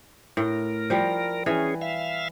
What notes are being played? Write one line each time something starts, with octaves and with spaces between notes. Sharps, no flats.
A2 A#4
F3 G3
E3 C#4 G#4
E5 F5